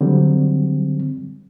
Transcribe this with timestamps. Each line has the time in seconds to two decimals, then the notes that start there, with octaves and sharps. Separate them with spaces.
0.01 D3 F#3 G3 C4